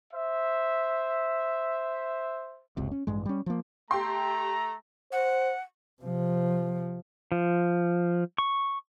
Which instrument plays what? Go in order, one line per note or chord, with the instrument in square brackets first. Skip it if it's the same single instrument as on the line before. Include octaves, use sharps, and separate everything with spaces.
[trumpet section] C5 E5
[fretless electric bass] F#1 C#2 C3
C#4
A1 G2 G#3
G3 C#4
F3 A#3
[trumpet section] A3 A#5 [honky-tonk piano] G4 G5 C6
[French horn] C5 [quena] F#5
[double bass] C3 F3
[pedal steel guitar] F3
C#6